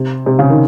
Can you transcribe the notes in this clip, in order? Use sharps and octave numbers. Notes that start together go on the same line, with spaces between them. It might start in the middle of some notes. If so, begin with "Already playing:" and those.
Already playing: C3
C3
C#3
D#3